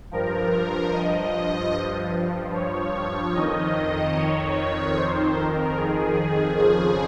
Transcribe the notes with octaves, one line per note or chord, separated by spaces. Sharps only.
G2 F3 A#4
D#5
C#5
F2 D#3 D#5
C#5
C5
A#4
G#4
F2 C#3 F3 G#4